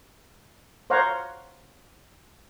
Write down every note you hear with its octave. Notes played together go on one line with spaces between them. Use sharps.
C5 C#5 F5 F#5 A#5